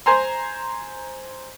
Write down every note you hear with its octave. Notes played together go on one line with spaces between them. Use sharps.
C5 G#5 A#5 C6